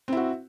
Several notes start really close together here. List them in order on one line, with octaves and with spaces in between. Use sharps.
C4 E4 F#4